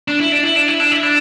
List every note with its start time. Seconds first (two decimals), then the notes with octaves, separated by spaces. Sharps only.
0.08 D4
0.20 E4
0.32 D4
0.44 E4
0.56 D4
0.68 E4
0.80 D4
0.91 E4
1.03 D4